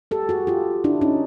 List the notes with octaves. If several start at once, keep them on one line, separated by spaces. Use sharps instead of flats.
G4 A4
F#4 G#4
F4 G4
D4 E4
C#4 D#4